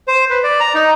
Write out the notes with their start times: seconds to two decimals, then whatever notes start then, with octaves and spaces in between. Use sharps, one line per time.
0.08 C5
0.30 B4
0.43 D5
0.60 A#5
0.75 D#4